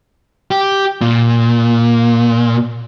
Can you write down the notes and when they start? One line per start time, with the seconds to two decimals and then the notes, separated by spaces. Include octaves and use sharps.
0.51 G4
1.01 A#2